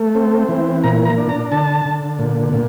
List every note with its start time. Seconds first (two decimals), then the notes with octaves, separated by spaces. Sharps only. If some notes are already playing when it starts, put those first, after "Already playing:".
Already playing: A3
0.15 C4
0.49 E3
0.84 A#2 A#5
1.05 A#5
1.18 D4
1.29 A#5
1.52 D3 A5
1.85 D3
2.19 A#2
2.53 A#2